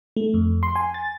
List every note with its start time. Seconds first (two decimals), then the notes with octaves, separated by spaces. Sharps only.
0.17 A3
0.34 F2
0.63 C6
0.76 G#5
0.94 A6